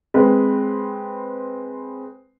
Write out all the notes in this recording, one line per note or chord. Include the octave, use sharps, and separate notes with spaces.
G#3 C4 B4